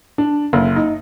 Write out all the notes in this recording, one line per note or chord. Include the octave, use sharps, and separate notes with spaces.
D4
F#1
D#4